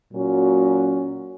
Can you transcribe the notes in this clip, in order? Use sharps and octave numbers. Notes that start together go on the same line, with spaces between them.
A#2 F#3 C#4 F#4